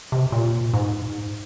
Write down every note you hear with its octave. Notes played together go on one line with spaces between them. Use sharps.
C3
A#2
G#2